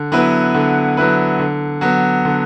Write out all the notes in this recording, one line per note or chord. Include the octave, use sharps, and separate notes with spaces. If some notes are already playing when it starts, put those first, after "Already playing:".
Already playing: D3
F#3 B3 E4 B4
D3
F#3 B3 E4 B4
D3
F#3 B3
D3